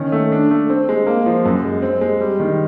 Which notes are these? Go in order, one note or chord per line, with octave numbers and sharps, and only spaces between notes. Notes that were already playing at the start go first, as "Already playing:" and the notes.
Already playing: D#3 C#4
A3
D4
A3
C4
G#3
A#3
F3
F#2
G#3
C4
G#3
G3
D#3